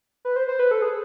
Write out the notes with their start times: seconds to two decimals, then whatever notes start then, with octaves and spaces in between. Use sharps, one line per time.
0.25 B4
0.36 C5
0.48 C5
0.59 B4
0.71 A4
0.82 G#4